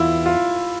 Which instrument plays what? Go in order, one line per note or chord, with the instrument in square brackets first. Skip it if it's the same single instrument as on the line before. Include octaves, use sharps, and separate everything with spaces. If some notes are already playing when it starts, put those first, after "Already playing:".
Already playing: [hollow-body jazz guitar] E2 E3 [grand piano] E4 F4
[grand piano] F4